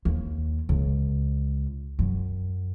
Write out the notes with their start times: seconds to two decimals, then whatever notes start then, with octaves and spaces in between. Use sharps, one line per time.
0.05 D#2
0.69 C#2
1.99 F#2